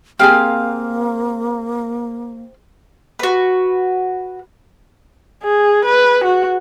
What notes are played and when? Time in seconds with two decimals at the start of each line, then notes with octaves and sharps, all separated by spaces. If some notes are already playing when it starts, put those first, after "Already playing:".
0.19 A#3 C4 G4 G#4 F5 G#5
3.19 F#4 B4
5.44 G#4
5.85 B4
6.25 F#4